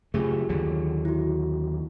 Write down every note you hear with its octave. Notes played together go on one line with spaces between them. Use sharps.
F#2 C#3 A3 F4 G4 G#4
D#2 D3 F#3
E4 F#4